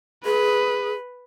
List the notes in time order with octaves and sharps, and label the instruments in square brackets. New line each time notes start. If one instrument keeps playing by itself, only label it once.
[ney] G#4 [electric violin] B4